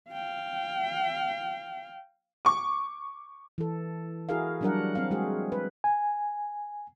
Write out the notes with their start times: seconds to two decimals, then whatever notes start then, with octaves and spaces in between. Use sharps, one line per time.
0.11 F5 G5
2.45 C#6 D6
3.58 E3 A4
4.29 E4 F#4 G#4 A#4 F5
4.61 F#3 G3 D4 F#4 A#4 F#5
4.95 C4 F5
5.11 G#3 F#4 G#4
5.52 B4
5.84 G#5